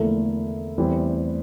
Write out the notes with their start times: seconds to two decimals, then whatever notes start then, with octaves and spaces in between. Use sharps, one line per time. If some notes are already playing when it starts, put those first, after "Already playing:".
Already playing: E2 D3 F3 A3 A#3 E4
0.78 E2 E3 G3 C4 G4